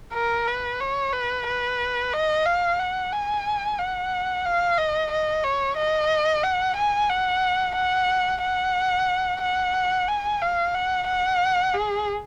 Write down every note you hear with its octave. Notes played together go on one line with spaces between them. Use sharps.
A#4
B4
C#5
B4
B4
D#5
F5
F#5
G#5
F#5
F5
D#5
D#5
C#5
D#5
F#5
G#5
F#5
F#5
F#5
F#5
G#5
F5
F#5
F#5
G#4